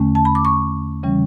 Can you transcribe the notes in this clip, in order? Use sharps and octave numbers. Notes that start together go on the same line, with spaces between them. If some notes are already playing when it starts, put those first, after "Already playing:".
Already playing: E2 D3 A3 C#4
A5
B5
D6
C#6
C#3 E3 G3 C#4